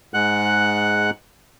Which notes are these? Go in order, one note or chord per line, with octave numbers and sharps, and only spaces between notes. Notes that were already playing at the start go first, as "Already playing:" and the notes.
G#2 G#3 F#5 F#6